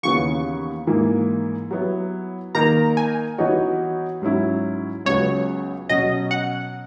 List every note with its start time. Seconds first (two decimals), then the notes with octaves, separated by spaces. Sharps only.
0.03 D#2 C#3 E3 B3 C#6
0.87 G#2 E3 A#3
1.71 F#3 B3 E4
2.55 D#3 A#3 D#4 A#4 A#5
2.97 G#5
3.38 E3 B3 D#4 F#4 C#5
4.22 G#2 F#3 C#4 E4
5.05 C#2 C#3 F#3 B3 C#5
5.89 B2 F#3 C#4 D#5
6.31 F#5